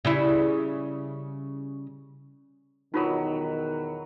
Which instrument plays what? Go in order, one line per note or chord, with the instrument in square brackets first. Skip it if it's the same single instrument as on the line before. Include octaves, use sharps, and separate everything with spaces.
[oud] C#3 G3 E4
[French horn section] E2 B2 D#3 [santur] F#3 B4 [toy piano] D#4 F4 A4